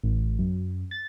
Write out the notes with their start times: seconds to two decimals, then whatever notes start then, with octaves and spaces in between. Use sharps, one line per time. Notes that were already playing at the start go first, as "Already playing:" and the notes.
0.03 A1
0.38 F#2
0.91 A6